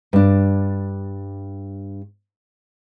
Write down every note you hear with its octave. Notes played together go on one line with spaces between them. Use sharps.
G2 D4